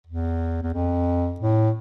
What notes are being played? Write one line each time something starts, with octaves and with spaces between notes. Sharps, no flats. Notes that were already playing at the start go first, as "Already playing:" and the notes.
E2
E2
F2
A2